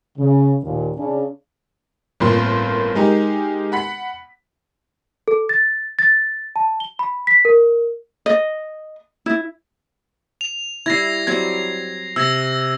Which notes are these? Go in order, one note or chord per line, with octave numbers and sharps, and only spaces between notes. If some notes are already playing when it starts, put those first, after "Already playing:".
C#3
D#2 A#2
C#3 C#4 D4
G1 A2 A#3 C4 F4 C6
G#3 D#4 G4 A#4
F#5 B5 B6
A4
A6
A6
A5
G7
B5
B6
A#4
D#5
E4
F7
G3 E4 G#6 A#6 C7
F#3 G3 C4 G#6
C3 E6 G#6 A#6